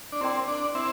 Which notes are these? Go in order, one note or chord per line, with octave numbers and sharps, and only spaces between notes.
D4
C4 E4 A#4 D5 G5 C6
D4
C4 E4